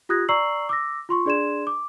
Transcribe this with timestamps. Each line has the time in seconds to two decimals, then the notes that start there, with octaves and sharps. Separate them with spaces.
0.09 F4 G4 D#6 F#6 G#6 A#6
0.29 D5 A#5 C#6 E6 C7 F#7
0.69 D6 E6 A#6
1.09 F4 C6 C#6
1.26 D4 G#4 D5 C6 G#6 E7
1.67 D6